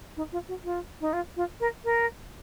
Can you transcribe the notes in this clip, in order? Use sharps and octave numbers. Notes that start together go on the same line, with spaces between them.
D#4
F4
F#4
F4
D#4
F4
F4
A#4
A#4